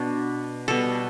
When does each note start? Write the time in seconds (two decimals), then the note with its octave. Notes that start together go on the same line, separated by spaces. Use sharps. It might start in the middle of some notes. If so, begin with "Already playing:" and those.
Already playing: B2 D4
0.68 B2 G3 B3 A4